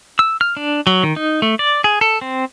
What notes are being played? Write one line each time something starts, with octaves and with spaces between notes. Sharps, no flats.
E6
F6
D4
F#3
D#3
D#4
A3
D5
G#4
A4
C4